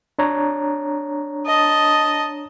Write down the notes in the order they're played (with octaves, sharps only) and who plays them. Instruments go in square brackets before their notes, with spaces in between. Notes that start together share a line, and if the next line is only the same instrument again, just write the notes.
[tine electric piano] D4 C#5 A#5
[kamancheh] D#5 A5